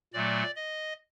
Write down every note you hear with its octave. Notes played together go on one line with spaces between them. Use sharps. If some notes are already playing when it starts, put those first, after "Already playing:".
A#2 F#3 A3 D5
D#5